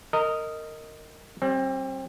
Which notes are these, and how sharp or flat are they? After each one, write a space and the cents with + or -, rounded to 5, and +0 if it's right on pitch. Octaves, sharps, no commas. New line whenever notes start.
A#4 -20 D#5 +0
G3 -30 C4 +30